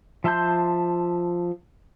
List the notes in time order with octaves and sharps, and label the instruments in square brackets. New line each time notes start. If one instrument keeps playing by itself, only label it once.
[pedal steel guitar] F3 E5 A5 C6 G6